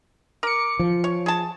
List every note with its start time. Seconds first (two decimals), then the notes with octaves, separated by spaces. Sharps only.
0.43 A#4 D6 C#7
0.79 F3
1.04 C#5
1.26 G#4 A5